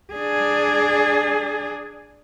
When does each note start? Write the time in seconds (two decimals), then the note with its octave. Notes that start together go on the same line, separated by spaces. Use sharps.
0.13 D4 G#4